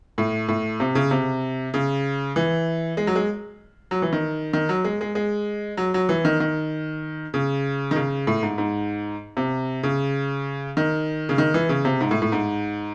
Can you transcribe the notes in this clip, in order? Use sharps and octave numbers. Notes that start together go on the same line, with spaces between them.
A2
A2
C3
C#3
C3
C#3
E3
G#3
F#3
G#3
F#3
E3
D#3
D#3
F#3
G#3
G#3
G#3
F#3
F#3
E3
D#3
D#3
C#3
D#3
C#3
A2
G#2
G#2
C3
C#3
D#3
C#3
D#3
E3
C#3
C3
G#2
A2
A2
G#2